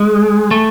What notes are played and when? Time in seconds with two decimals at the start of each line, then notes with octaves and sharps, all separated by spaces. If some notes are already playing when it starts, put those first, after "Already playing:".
Already playing: G#3
0.51 A3